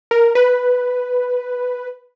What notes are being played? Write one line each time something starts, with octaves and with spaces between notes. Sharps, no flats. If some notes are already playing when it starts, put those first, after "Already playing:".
A#4
B4